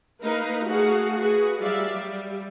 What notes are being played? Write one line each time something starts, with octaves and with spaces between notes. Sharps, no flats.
A#3 D#4 A#4 B4 F5
A3 F#4 G#4 F5 F#5
F#4 G#4 B4
F#3 G3 D5 E5 F5
G3